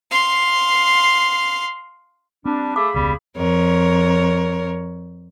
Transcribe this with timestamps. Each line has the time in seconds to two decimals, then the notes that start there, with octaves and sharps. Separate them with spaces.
0.11 F5 C6
2.46 G3 C4 D4
2.76 A3 G#4 F5 B5 D6
2.94 E1 C#2 G3 B3
3.36 F2 A#4 C#5